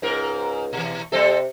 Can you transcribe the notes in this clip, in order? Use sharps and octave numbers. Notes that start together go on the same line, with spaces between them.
C#2 G#2 A#4
B2 E3
C3 G3 C4 A4